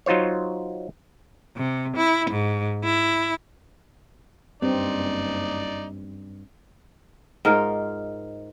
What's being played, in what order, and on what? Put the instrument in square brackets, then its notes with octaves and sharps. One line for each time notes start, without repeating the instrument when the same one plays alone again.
[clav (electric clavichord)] F#3 D#4 F4 C5 C#5
[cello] C3
E4
G#2
E4
[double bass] F#1 [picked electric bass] G2 [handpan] C4 [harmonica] D#4 D5
[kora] G#2 D#4 F4 A#4